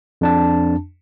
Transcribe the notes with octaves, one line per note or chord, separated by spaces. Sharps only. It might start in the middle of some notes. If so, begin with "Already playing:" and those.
F2 D4 A5